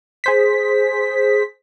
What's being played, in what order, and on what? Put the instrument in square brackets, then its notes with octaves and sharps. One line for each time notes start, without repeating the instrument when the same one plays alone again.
[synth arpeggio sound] G#4 C5 B6